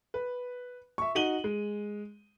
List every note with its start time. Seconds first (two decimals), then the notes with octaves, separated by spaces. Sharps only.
0.14 B4
0.98 E5 C#6
1.15 D#4 F#4 D#7 F#7 G7
1.44 G#3